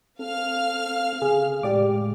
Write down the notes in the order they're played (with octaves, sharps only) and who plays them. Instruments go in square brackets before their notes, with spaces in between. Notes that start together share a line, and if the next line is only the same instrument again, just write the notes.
[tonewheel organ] C4 A4 [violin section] F5 F6
[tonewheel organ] C#3 [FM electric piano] G#4
[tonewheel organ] A2 G#3 [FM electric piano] G4 D5 D6